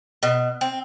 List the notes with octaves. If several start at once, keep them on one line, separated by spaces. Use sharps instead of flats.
B2
C4